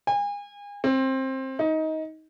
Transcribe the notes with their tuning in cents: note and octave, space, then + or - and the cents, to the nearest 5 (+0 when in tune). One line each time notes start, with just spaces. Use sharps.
G#5 -35
C4 +20
D#4 +20